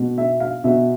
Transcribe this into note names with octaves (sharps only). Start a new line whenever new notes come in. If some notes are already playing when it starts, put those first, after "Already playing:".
Already playing: B2
E5
F5
B2 E5